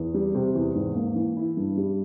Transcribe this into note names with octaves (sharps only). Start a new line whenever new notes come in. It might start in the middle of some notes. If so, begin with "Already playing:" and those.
Already playing: E2
G3
C3
E2
G#2
A#3
E3
E4
G2
G3